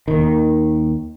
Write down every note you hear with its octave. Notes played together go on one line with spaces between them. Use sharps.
D#2 D#3